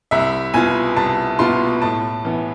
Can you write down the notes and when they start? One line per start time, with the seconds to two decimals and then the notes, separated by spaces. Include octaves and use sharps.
0.11 C2 E5
0.54 B2 B3 F4 G#5
0.96 C2 A5
1.39 B2 B3 F4 C6
1.82 A2 A5
2.25 E3 B3 E4